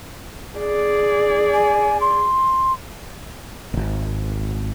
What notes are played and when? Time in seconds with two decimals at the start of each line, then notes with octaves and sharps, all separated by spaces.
0.58 G#4 D5
1.53 G#5
2.01 C6
3.73 D#1 G#1